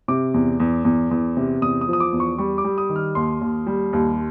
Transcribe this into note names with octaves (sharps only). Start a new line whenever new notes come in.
C3 D6
E2
E2
E2
E2
C3
E2 D#6
D#6
F3
D#6
D6
E2
C#6
G3 C#6
D6
G3
D#6
D#3
F6
D#2 C6
D#2
G3
D#2